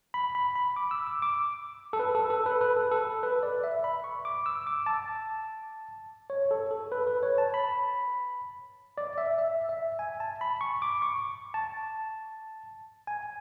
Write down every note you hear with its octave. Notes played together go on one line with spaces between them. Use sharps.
B5
B5
B5
D6
E6
D6
D6
A4
B4
A4
A4
B4
B4
A4
A4
B4
D5
E5
B5
C#6
D6
E6
D6
A5
C#5
A4
A4
B4
B4
C#5
A5
B5
D5
E5
E5
E5
G#5
A5
B5
C#6
D6
C#6
A5
G#5